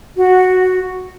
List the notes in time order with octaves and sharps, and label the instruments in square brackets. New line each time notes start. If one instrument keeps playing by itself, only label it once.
[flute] F#4